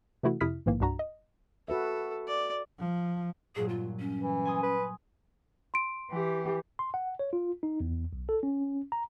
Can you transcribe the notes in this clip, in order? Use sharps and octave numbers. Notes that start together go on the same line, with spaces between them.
C3 E3 A3 E4 F#4
F2 C3 E4 D#6 F6 B6
A#1 G#2 D#3 E3 A#3
C2 G2 D4 F#4 A#5
D#5
F#4 A4 B4 E5
D5
F3
G2 A#2 F#3 G#4
F4
C#4
E3
G#5 C6 D#6
B4
C6 D7
E3 G4
C6
F#5
C#5
F4
D#4
E2
B1
A4
C#4
A#5